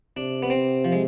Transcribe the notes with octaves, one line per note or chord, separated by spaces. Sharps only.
C3 D4
B3
C4
F3
G#3